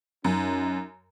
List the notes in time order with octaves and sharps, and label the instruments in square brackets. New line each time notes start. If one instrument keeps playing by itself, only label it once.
[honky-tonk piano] F#2 [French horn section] C#4 D#4